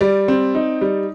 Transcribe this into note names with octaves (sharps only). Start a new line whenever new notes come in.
G3 D5
C4
D#4
G3